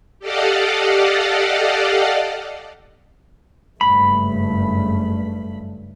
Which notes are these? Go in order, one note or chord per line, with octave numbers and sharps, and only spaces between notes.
G4 A4 D5 D#5 F5 F#5
F#1 G2 A3 B5